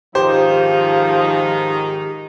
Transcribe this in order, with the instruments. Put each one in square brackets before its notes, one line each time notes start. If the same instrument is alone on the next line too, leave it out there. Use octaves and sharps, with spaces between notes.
[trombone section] G#2 D#3 D#4 [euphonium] F3 [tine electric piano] G4 [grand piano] C5